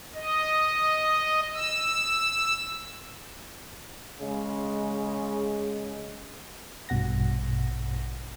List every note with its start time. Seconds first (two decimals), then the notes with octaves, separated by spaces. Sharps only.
0.15 D#5
1.54 E6
4.20 C#3 G#3
6.89 A#1 G2 B2 F#5 A#6